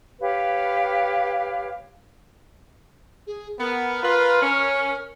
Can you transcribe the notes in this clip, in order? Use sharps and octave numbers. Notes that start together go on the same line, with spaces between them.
G4 B4 C#5 F5
G#4
B3 A#4
F4 B4
C#4